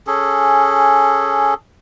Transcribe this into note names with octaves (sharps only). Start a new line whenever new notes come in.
C#4 G#4 A4